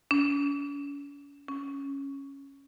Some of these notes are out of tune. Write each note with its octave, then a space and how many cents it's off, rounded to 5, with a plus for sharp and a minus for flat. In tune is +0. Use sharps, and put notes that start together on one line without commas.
C#4 +40
C#4 -5